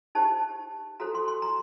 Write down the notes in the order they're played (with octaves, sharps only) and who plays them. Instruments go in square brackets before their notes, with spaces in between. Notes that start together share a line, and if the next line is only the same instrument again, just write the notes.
[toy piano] D#4 G4 C5 A5
F#4 A4 C5 A#5
C6
C6
A#5